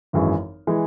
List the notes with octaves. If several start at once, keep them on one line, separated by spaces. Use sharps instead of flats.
G#1 F#2 E3 G#3
E3 G#3